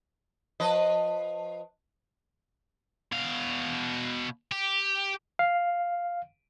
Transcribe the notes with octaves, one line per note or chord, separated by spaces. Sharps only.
F3 B4 D#5
B2 F5
G4
F5